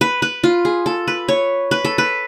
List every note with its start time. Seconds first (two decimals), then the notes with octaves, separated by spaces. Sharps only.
0.01 B4
0.22 B4
0.44 F4
0.65 G#4
0.86 A4
1.08 B4
1.28 C#5
1.71 B4
1.85 A4
1.98 B4